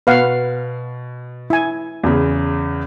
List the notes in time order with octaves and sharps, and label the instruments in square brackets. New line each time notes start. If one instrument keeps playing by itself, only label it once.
[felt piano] B2 [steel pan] B4 F5 F#5
[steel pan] E4 G#5
[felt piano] E2 C#3